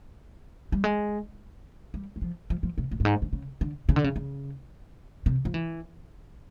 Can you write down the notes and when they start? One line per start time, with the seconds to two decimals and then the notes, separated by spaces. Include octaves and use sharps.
0.72 G3
0.84 G#3
1.94 G3
2.16 F#3
2.22 F3
2.50 F3
2.63 F3
2.78 C3
2.91 A#2
3.00 G2
3.05 G#2
3.22 D3
3.33 C#3
3.61 D3
3.89 C#3
3.96 D3
4.04 C#3
4.16 C#3
5.26 C3
5.45 F3
5.54 E3